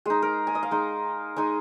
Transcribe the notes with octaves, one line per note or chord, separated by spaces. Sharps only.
G#3 D#4 G#4
A#4
G#5
D#5
F5
G#3 D#4
G#3 D#4 G#5